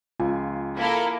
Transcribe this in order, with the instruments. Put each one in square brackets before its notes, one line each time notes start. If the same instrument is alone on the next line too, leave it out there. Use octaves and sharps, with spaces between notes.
[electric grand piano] C#2 G#5 [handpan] F4
[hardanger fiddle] A#3 [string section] E4 A4 A#4